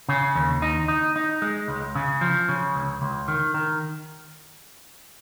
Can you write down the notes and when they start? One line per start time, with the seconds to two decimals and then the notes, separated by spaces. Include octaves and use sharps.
0.09 C#3
0.35 D#2
0.62 D#4
0.88 D#4
1.16 D#4
1.42 G#3
1.68 C#2
1.95 C#3
2.21 F3
2.49 C#3
2.75 C#2
3.02 C#2
3.28 D#3
3.54 D#3